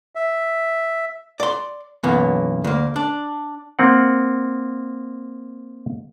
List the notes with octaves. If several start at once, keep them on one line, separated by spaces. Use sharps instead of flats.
E5
D5 C6
B1 F#2 E3 A#3 B3
D2 A#3
D4
A#3 C4 F#5